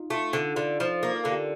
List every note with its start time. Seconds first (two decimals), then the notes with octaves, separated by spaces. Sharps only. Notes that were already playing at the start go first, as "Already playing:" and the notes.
Already playing: D#4 F4
0.10 A3 F4
0.33 D3 A4
0.56 D3 F4
0.80 F3
1.03 A#3
1.16 A#4
1.24 D3 A4
1.32 G4